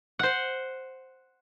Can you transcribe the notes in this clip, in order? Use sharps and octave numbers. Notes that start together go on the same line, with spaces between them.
C5 F#5